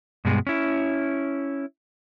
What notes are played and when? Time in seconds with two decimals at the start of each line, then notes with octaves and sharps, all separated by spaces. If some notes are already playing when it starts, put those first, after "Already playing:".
0.25 G2 B2 G#3
0.47 C#4 E4